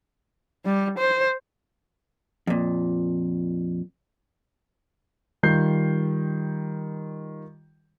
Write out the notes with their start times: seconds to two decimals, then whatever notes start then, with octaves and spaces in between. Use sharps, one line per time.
0.65 G3
0.98 C5
2.47 F2 A#2
5.43 D#3 G3 F4 G6 C7